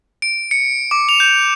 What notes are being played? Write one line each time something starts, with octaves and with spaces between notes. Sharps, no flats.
D7
C#7
D6
F7
G6